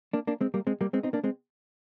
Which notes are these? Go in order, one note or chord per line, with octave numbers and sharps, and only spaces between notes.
A#3 D4
A#3 D4
G#3 C4
G3 A#3
G#3 C4
G3 A#3
G#3 C4
C4 D#4
A#3 D4
G#3 C4